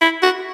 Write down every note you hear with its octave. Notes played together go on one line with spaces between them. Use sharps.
E4
F#4